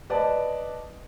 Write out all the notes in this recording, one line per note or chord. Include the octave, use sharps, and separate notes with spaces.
B4 D5 D#5 A5